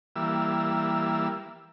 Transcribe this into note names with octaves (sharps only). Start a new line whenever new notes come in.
E3 G3 A#3 E6